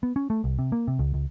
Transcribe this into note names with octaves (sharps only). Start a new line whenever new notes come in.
B3
C#4
A3
C2
C3
A#3
C3
C#2
C#2